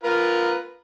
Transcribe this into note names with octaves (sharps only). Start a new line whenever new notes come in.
F4 A#4 B4